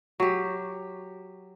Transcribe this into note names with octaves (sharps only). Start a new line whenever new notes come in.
F#3 G4